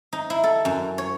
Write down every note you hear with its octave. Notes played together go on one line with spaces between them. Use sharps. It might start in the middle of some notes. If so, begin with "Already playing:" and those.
D#4
E4
A4
F#2
C#5